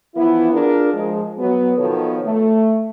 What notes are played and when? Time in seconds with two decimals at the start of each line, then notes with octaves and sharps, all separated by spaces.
0.15 E3 F3 B3 E4
0.53 D4 F4 G#4 A#4
0.94 F3 G#3
1.38 F#3 B3
1.77 B2 D#3 F3 B3 A4 C#5
2.23 A3